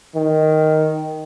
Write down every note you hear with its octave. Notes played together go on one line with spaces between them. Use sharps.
D#3